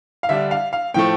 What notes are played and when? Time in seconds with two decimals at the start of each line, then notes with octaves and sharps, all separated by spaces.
0.23 F5
0.29 D3 G3 D4 E5
0.51 F5
0.73 F5
0.94 A2 F3 A3 G5